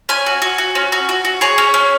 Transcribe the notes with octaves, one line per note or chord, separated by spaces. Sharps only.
C#4 G#5
F#4
F#4
F#4
C#4
F#4
F#4
F#4
G#4 C#5
C#4
C#4